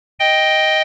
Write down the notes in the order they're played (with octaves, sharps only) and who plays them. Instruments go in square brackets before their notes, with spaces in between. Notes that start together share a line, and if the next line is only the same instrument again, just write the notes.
[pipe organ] D#5 G5